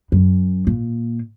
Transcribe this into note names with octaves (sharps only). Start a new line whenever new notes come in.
F#2
A#2